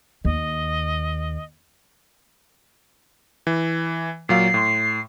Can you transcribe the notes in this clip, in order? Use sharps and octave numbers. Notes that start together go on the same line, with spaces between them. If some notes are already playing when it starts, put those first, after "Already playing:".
D#2 D#5
E3
A#2 F#3 F5 C7
A2 C6